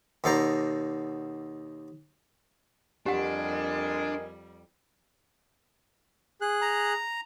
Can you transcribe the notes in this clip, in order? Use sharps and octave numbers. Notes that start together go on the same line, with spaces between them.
D#2 B2 A4 C5 D5 A#5
F2 G3 D4 G4 A#4 D#5 F#5 G#5
G#4 F#6
A#5